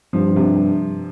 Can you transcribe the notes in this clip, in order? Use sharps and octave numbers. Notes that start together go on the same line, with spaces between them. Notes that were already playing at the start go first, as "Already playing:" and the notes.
G2 F3
C3